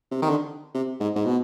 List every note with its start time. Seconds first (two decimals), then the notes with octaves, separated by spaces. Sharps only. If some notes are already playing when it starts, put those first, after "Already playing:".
0.11 C3
0.22 D#3
0.30 D3
0.74 C3
1.00 G#2
1.16 G#2
1.26 B2